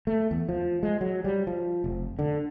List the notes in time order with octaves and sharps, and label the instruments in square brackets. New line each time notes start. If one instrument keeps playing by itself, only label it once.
[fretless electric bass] A3
E2
F3
G#3
F#3
G3
F3
F1
D3